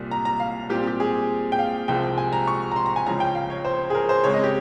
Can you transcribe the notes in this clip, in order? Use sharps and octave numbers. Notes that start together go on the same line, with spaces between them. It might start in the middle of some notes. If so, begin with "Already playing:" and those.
Already playing: C2 A#2 G3
A#5
A#5
F5
A#2 G3 C4 G4
G4
G#4
G5
F5
C2 C3 F3 G#3 C4 G5
G#5
A#5
C#6
A#5
C6
A#5
G#5
C#2 C#3 F3 A#5
G5
F5
C#5
C5
G#4
A#4
C5
C#2 C#3 G#3 C4 C#5
D#5
G4